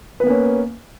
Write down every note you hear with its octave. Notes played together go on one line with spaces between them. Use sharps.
A#3 B3 C#4 B4